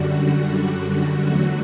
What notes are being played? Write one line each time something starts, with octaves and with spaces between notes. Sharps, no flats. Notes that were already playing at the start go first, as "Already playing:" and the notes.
Already playing: F#2 D3 G3 F#4
F#4
E2 D3 F#3 A3